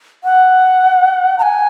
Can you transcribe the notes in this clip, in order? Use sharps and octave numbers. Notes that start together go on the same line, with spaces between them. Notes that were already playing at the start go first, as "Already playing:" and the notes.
F#5
A#5
G#5